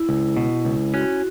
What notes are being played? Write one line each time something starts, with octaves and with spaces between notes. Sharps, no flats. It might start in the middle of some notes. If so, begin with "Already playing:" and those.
Already playing: E4
C#2
B2
C#2
C#4 F#4